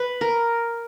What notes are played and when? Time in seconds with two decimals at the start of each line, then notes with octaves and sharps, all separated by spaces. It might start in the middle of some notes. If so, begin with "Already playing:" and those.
Already playing: B4
0.21 A#4